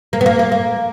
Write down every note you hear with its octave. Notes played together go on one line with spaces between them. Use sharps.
A#3
B3
A#3
A#3
A#3